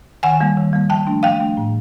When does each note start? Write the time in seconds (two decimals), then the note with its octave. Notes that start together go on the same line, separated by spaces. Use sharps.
0.23 D#3 F#5 G#5
0.40 G3 A#3
0.57 D#3
0.73 G3 A#3
0.90 F3 G5 A5
1.07 A3 D4
1.23 F3 F5 G5
1.40 A3 D4
1.57 A2